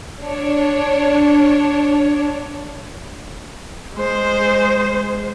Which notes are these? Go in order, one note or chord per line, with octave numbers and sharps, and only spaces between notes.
D4 C#5
G#3 C5